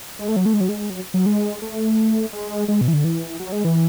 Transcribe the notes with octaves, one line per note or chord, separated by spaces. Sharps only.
G#3
A3
F#3
A3
G#3
F#3
G#3
F#3
F#3
G#3
A3
G#3
G#3
B2
E3
D3
E3
F#3
G#3
E3